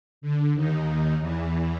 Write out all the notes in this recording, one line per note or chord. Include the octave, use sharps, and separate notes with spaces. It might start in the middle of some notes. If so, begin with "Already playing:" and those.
D3
D#2 D#3
E2 E3